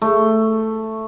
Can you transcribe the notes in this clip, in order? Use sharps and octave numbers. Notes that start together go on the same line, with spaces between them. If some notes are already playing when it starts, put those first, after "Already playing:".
A3